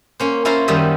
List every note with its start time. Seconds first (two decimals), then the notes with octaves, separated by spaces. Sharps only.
0.20 A#3 C#4 C5
0.45 C#4 E4 F4 C5 F5 A#5
0.68 F#2 D#3 G3 D#5 E5